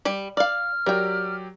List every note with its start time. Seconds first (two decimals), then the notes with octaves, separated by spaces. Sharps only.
0.05 G3 G4
0.37 D5 F5 F6
0.86 F#3 G4 A#4 D5 G5